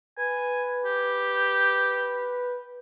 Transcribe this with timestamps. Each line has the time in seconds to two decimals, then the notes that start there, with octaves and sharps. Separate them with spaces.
0.19 B4 G#5
0.85 G4